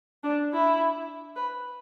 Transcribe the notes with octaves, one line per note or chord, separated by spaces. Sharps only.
D4
E4
B4